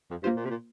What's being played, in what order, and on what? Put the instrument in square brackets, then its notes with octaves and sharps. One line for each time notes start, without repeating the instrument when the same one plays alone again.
[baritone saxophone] F2
[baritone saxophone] G2 [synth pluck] A#3 F4 C5
[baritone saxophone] A#2
C3
A#2